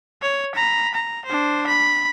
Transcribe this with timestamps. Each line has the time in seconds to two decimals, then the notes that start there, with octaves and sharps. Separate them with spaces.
0.22 C#5
0.55 A#5 B5
0.95 A#5
1.26 D4 C5
1.67 B5